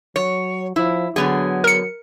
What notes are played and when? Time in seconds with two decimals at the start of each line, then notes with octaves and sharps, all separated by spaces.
0.16 F#3 C#5
0.76 F3 E4
1.16 D3 F#3 B3 G#4
1.64 A#4 C#7